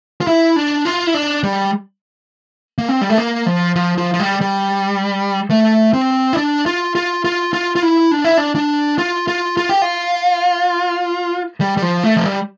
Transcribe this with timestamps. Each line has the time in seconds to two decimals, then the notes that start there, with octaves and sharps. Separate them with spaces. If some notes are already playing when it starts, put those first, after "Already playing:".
0.21 F4
0.27 E4
0.56 D4
0.85 F4
1.07 E4
1.14 D4
1.43 G3
2.78 A#3
2.89 C4
3.01 G3
3.10 A3
3.18 A#3
3.46 F3
3.76 F3
3.98 F3
4.14 F3
4.20 G3
4.41 G3
5.50 A3
5.93 C4
6.33 E4
6.37 D4
6.66 F4
6.95 F4
7.24 F4
7.53 F4
7.76 F4
7.82 E4
8.11 D4
8.24 E4
8.37 D4
8.55 D4
8.98 F4
9.28 F4
9.57 F4
9.69 G4
9.82 F4
11.61 G3
11.77 G3
11.82 F3
12.03 A3
12.16 F3
12.26 G3